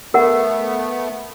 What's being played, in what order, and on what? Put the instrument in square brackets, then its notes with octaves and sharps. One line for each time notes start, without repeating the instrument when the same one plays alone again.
[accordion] A3 B3 [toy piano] A#4 F#5